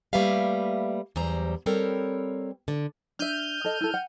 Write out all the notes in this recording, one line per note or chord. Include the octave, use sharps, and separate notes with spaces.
G3 A3 A#3 B4 E5 F5
E2 F#3 G3 C5 A#5
G3 C4 A4 A#4 C#5
D3
D4 E5 F6 G6 D#7
A4 D#5
E4 A4
F#5